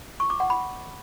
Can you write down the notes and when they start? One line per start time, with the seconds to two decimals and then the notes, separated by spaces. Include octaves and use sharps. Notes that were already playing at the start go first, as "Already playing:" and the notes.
0.20 C#6
0.30 D6
0.40 F#5
0.50 B5